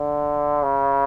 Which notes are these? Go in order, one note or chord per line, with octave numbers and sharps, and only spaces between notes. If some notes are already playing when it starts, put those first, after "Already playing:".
Already playing: D3
C#3